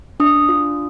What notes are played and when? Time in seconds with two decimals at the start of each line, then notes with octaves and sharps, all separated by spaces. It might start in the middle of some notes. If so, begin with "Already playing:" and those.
0.20 D4 D#6
0.49 F4